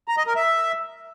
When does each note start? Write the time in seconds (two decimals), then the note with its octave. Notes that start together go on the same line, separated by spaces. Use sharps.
0.08 A#5
0.17 D#5
0.27 A#4
0.36 E5